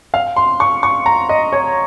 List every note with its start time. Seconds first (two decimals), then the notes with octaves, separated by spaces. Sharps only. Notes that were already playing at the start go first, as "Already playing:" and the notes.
0.14 F5
0.36 C6
0.60 C#6
0.83 C#6
1.06 A#5
1.29 D#5
1.52 C#5